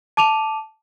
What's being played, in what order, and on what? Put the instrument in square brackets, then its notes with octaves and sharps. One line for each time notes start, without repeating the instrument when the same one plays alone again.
[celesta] A5 D6 D#7 F7